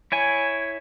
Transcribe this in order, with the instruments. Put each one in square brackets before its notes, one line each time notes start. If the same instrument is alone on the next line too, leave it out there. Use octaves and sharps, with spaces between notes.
[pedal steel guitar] E4 C#5 G#5